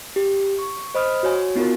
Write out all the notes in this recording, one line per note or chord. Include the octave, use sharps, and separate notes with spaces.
G4
C#6
C5 D#5 B5 D#6 F6
F#4 C#5 G#5
B3 D#4 F4 F#4 A#4